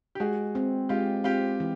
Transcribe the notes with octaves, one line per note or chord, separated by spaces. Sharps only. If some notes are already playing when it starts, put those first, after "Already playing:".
G4
G#3 F#4 G#4
C4
G#3 F4 G4
C4 F4 G4
E3